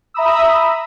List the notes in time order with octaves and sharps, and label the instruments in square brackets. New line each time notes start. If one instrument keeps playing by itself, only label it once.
[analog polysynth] E5 A#5 B5 D#6 E6